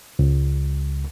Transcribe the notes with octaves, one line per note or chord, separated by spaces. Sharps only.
C#2